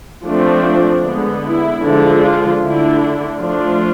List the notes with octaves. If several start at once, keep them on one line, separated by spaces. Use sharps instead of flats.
F3 A3 C4 D4
D3 G#3 B3
E4
D3 F3 G#3 D4
F4
D3 A3 D4 E4
F3 A3 D4 F4